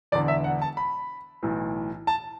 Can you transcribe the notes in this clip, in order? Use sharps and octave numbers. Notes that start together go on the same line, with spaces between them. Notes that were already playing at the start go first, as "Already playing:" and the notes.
E1 E2 D3 D5
E5
F#5
A5
B5
B1 A2 E3
A5